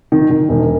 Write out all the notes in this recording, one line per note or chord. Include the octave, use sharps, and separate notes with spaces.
D#3
D#3
E1